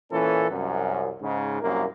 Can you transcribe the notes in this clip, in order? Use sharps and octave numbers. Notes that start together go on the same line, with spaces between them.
A#2 E3 C#4 A4
C2 F#2
G#2 C#3
C2 F#2 A#3